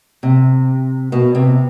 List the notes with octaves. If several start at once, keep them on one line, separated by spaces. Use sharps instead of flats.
C3
B2
C3